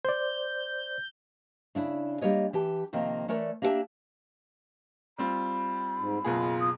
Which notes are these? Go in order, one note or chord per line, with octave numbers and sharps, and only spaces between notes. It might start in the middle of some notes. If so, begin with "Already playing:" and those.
C5 D5 G6
C#3 D4 E4
G3 A#3 C#5 D#5
E3 G4 A5
C3 D#3 F3 A#3 C4
E3 A3 A#4 C#5 D5
A#3 D4 G4 A#4 E5 A5
G3 C4 F4 B5
G#2
F#1 B2 F4 G#4
D#6